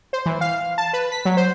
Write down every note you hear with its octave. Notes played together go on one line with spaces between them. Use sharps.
C5
E3
F5
A5
B4
B6
F#3
C5